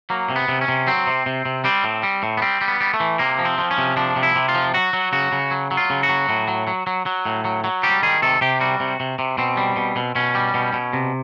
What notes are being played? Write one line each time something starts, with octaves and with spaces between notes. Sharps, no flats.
F#3 A#3
C3
B3
C3
C#4
C3
F#3 C4
C3
C3
C3
G3 C4
A2
G3
A2
B3
G3 C4
G3
B3
G3
A3
E3
C3 A#3
F3
C4
F3
C#4
C3
F3 D4
C3
E4
C3
F4
F3
F#3 F#4
F#3
C#3 F#4
C#3
F#3
F#3
F4
C#3
F#4
F#3
A2
F#3
F#3
F#3
F#3
A2
F#3
F#3
G3 G4
D#3 G#4
C3 A4
C3 G4
G3 F#4
C3
C3
C3
B2 C4
G3
B2
B2
B2 C#4
G3
B2
B2
C3